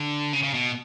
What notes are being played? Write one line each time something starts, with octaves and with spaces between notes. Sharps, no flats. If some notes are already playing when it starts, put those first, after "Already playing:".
Already playing: D3
C#3
C#3
B2